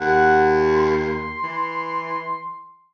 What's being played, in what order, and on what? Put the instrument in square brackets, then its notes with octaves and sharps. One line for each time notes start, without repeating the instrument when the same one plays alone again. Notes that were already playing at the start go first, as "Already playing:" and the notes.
[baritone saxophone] D#2 [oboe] F#5
[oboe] C6
[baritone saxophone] E3